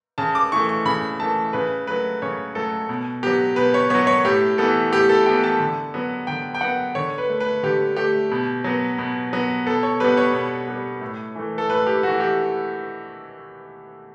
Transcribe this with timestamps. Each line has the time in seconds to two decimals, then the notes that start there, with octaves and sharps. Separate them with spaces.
0.18 C#3 A5
0.35 D6
0.52 E3 A3 C#6
0.69 C#6
0.85 C#3 B5
1.20 E3 A3 A5
1.53 C#3 B4
1.87 F#3 A3 B4
2.22 C#3 C#5
2.55 F#3 A3 A4
2.89 B2
3.23 F#3 B3 G4
3.56 B2 B4
3.74 C#5
3.90 F#3 B3 C#5
4.07 C#5
4.24 A2 G4
4.58 E3 B3 A4
4.92 A2 G4
5.09 A4
5.26 E3 B3 G5
5.44 A5
5.60 D3
5.94 F#3 B3
6.27 D3 G5
6.54 G5
6.61 F#3 B3 F#5
6.95 D3 C#5
7.18 B4
7.29 A3
7.40 B4
7.63 D3 G4
7.96 A3 G4
8.31 B2
8.64 F#3 B3
8.98 B2
9.33 F#3 B3
9.67 B2 A4
9.83 C#5
10.00 G3 B3 B4
10.17 C#5
10.33 B2
10.68 G3 B3
11.01 A2
11.35 E3 A3
11.58 A4
11.69 A2 B4
11.87 G4
12.03 E3 A3 F#4
12.20 G4